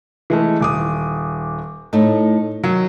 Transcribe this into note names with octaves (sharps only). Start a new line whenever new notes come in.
E3 G#3 A3
D#1 D6 D#6
A2 A3 D#4
D#3 F#3